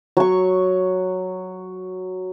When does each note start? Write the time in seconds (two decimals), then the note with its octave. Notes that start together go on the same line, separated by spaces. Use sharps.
0.17 F#3 C#6